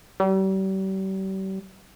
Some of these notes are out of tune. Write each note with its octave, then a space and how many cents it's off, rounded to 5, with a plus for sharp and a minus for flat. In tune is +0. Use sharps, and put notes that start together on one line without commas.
G3 -40